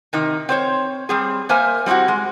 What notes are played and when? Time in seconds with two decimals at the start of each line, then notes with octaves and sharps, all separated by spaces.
0.13 C3 D#3 D#4
0.49 C4 C5 C#5
1.09 G3 C4 G#4
1.49 A#3 A#4 C5 E5 G#5
1.86 G3 C4 D#4 E4 F#4
2.08 G#3